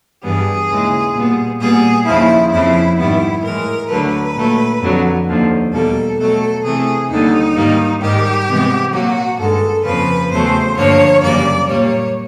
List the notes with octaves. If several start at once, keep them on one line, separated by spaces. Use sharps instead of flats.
G2 E3 G3 B3 G#4
D#2 C#3 E3 G#3
A#2 G3 B3
A#2 G3 B3 G#4
D#2 C#3 F3 E4
F2 C#3 F3 E4
G#2 D#3 G3 B3 E4
A2 E3 G#3 A#4
D2 D3 F#3 A3 B4
A#2 F#3 A3
F2 D3 F#3
D#2 D3 F3
E2 B2 G3 A#3 A4
B2 F#3 A3 A4
C3 E3 A3 G#4
D#2 D3 G3 D#4
G#2 D#3 G3 A#3
G#2 D#3 G3 G4
C3 E3 G#3 B3
A#2 F#3 A#3 F#4
G2 D#3 G#3 A4
F2 C#3 F3 A#3 B4
E2 C#3 F#3 A3 C5
G2 D3 F3 A#3 C#5
F#2 C#3 E3 G3 A#3 D5
A#2 G3 A#3 C#5